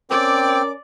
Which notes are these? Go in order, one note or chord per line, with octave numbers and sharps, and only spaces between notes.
C4 C#4 A#4 D5 G5 D6